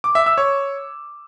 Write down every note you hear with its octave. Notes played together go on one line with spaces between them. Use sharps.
D6
E5
E6
C#5